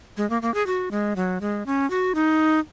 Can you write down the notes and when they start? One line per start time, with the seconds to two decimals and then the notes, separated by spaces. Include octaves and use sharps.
0.17 G#3
0.30 A#3
0.42 A#3
0.54 G#4
0.67 F#4
0.91 G#3
1.16 F#3
1.41 G#3
1.66 C#4
1.90 F#4
2.15 D#4